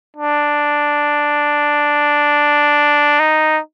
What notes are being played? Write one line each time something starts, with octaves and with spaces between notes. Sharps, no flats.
D4
D#4